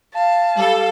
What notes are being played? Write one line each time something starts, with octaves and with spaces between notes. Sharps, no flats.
F5 A5
G3 A4